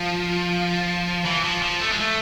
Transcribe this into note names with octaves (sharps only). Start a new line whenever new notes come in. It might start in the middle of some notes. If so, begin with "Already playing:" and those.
Already playing: F3
E3
F3
F3
A3
G#3
A3